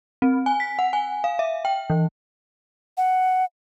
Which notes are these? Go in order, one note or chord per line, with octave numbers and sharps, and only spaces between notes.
C4
G#5
B6
F#5
G#5
F5
E5
G5
E3
F#5